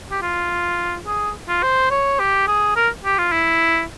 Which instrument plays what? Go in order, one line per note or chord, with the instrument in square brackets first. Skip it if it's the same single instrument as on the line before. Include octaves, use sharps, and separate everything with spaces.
[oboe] G4
F4
G#4
F4
C5
C#5
G4
G#4
A#4
G4
F4
E4